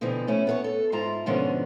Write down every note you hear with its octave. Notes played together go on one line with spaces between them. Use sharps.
B2 D3 E3 F3 C4
A3 C#4 E4
B3 A4 C#5
A4
G#2 E4 F4 A5 A#5
G#2 B2 D3 F3 B3 C#4